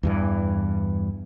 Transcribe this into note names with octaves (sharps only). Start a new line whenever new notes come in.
E2 G2 E3